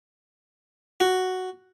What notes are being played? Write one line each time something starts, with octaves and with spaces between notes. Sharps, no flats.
F#4